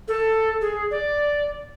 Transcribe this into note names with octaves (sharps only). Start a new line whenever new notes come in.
A4
G#4
D5